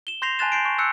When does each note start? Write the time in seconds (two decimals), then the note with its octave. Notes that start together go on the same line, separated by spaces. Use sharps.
0.07 E7 G7
0.22 C6 G6 A#6 C7 F7
0.39 G#5 A5 C6 F#6 A6 E7
0.52 C6 G6 C7 D7
0.65 C#6
0.78 E6 F#6 G6 C#7